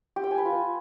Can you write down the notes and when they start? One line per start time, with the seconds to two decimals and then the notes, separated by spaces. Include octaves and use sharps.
0.16 G4
0.24 G5
0.31 G#5
0.38 B4
0.45 F4